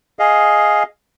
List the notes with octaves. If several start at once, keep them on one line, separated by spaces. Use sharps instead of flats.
G#4 D#5 F5